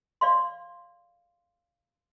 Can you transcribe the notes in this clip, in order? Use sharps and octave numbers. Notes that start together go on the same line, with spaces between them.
D5 F5 C6